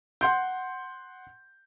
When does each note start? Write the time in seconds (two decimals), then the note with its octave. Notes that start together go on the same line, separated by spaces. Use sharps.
0.21 F#5 C6 G6